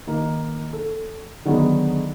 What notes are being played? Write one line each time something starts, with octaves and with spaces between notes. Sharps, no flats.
D#3 A#3
A4
D3 D#3 F#3 G#3 B3